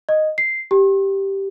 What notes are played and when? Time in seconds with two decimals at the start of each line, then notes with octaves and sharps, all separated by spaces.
0.09 D#5
0.38 C7
0.71 G4